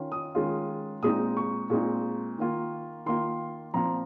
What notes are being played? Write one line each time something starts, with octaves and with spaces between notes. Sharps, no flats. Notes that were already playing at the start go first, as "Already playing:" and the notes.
Already playing: D#3 C#4 F4
D#6
D#3 G#3 C#4 F4
A#2 G#3 C4 D#4 D#6
C#6
A#2 G#3 C4 D#4
D#3 A#3 F4
D#3 A#3 F4 C6
A#2 F3 C4 F4 A#5